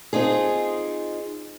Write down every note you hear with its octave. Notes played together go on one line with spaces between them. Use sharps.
C4 D#4 F4 G#4